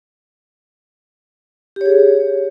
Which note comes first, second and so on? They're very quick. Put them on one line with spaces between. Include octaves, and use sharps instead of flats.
G4 C#5 G#4